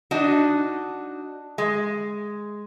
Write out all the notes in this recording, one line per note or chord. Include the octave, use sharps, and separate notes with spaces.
D4 D#4 F#4
G#3